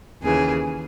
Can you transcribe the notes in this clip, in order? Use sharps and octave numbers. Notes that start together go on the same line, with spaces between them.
D#2 C#3 E3 G#4